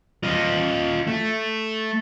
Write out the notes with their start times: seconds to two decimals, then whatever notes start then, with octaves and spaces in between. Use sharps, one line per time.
0.23 F4 D#5
1.07 A3